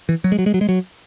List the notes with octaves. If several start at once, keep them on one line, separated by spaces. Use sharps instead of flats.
E3
F#3
G#3
F#3
G#3
F#3
G#3
F#3